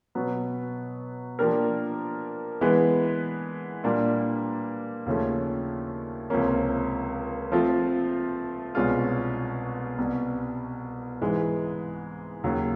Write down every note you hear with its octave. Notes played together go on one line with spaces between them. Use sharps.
B2 F#3 B3
F3 A#3 D4 G4 A#4
E3 G#3 B3
A#2 G3 A#3 D4
D#2 C#3 F3 A3 C#4
C#2 C3 F3 A#3 C#4
F3 A3 C4 F4
C2 B2 G#3 C#4 F4
C2 B2 G3
G#2 E3 G#3
D#2 C#3 F#3